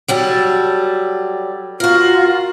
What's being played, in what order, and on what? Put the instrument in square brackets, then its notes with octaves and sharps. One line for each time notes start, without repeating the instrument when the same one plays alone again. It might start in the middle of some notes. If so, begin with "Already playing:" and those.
[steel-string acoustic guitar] F#3 G3 A4
[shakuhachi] F4 [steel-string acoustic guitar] F#4 A#4